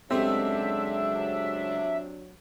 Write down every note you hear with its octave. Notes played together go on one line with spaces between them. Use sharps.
C#2 F#3 A3 C4 D4 G4 E5